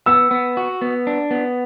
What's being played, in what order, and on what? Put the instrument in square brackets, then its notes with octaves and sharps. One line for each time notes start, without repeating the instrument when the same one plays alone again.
[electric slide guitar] B3 [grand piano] E6
[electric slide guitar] B3
F#4
B3
D4
B3